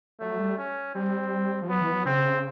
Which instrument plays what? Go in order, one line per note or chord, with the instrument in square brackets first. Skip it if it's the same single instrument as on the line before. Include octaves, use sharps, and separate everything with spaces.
[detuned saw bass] F#3 [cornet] A3
[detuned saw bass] G3
[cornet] C#4
[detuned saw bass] G3 [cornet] C4
[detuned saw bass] F3
[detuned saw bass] F#3 [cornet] B3
[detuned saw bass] E3
F#3
[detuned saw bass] C#3 [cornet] C4